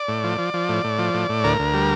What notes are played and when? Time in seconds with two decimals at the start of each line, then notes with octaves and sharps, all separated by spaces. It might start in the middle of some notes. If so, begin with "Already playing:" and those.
Already playing: D5
0.08 A2
0.24 F3
0.38 F3
0.54 F3
0.69 A2
0.84 A2
0.99 F3
1.14 A2
1.29 A2
1.44 D2 A#4
1.59 D2
1.73 G3